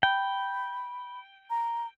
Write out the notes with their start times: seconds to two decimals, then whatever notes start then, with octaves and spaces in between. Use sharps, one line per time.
0.03 G5 B5
1.50 A#5